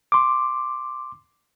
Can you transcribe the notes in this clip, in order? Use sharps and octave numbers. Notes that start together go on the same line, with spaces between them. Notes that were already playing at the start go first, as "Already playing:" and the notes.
C6 D6